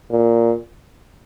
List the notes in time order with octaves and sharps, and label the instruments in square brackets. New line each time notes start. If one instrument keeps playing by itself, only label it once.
[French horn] A#2